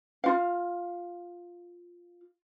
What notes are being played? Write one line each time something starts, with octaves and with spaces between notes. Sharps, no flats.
F4 F5